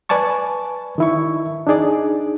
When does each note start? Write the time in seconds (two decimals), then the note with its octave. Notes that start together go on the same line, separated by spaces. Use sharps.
0.09 B4 D5 G#5 A5 C#6
0.98 D#3 E4 C#6
1.67 D4 D#4 G#4 D5